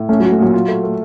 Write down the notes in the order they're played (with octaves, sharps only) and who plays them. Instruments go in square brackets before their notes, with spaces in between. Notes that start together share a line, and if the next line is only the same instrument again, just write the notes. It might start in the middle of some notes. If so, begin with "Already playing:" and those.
Already playing: [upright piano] A2
[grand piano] A3 [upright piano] C#4
[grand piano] F#3 [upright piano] F#4
[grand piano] A3
[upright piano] A#2 [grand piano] F#3
[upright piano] F4
A3
A3